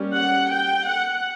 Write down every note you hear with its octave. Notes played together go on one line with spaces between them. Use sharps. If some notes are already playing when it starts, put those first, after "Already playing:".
Already playing: G3 A#3 C#4
F#5
G5
F#5